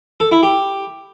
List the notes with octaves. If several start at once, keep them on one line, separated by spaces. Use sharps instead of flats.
A4
E4
G4